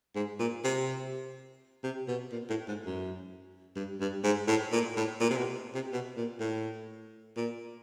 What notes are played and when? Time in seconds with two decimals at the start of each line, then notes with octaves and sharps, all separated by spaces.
0.16 G#2
0.39 A#2
0.64 C3
1.84 C3
2.08 B2
2.32 A#2
2.50 A2
2.68 G#2
2.86 F#2
3.76 G2
4.00 G2
4.24 G#2
4.48 A2
4.72 A#2
4.97 A2
5.20 A#2
5.30 C3
5.38 B2
5.75 C3
5.93 B2
6.17 A#2
6.40 A2
7.36 A#2